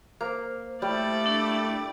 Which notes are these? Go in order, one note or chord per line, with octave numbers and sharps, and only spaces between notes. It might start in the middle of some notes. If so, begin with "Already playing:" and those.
A#3 C5
G3 A3 E4 D5
D4 A4